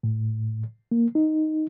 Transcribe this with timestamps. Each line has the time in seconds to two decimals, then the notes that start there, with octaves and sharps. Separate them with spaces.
0.03 A2
0.92 A#3
1.15 D#4